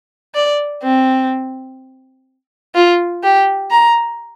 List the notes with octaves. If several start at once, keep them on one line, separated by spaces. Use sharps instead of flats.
D5
C4
F4
G4
A#5